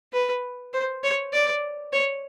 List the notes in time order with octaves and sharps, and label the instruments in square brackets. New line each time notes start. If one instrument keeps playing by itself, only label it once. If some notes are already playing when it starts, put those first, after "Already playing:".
[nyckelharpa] B4
C5
C#5
D5
C#5